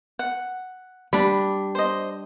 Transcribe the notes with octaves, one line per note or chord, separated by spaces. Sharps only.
F#5
G3 D4 B5
C5 D#5